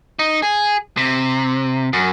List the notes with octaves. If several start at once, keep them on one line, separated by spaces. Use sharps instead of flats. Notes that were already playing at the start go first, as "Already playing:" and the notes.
D#4
G#4
C3
F#2